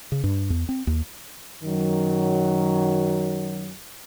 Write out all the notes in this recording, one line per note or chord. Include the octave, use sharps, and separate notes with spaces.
C#3
G2
E2
C4
D#2
F#2 D#3 F#3